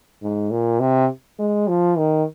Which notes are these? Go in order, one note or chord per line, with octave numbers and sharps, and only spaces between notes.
G#2
A#2
C3
G#3
F3
D#3